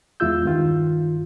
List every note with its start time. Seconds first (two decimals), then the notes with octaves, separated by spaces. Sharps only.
0.20 E2 G#3 E4 F4 E6 G6
0.45 G2 D#3 F4